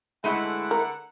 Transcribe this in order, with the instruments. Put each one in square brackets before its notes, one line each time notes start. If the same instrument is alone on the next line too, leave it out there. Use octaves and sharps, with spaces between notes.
[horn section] D3 B4 F#5 [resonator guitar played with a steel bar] G#3 A3 E4
[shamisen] A#4